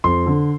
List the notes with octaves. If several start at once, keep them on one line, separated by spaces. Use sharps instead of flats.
F2 C6
D3